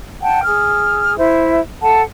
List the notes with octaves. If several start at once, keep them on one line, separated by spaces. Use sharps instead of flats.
F#5 G5 A5
G#4 F6
E4 C5 E5
A4 F#5 A5